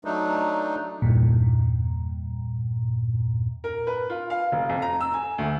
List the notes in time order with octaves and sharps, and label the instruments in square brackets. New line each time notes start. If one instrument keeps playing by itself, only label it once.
[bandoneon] F#3 A3 D4 D#4
[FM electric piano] E2 G2 A#2
[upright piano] A#4
B4
F4
F5
F1
F2
A#5
E6
G#5
D2